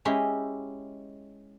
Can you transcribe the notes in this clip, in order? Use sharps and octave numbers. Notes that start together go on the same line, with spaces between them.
G#3 C#4 E4 G4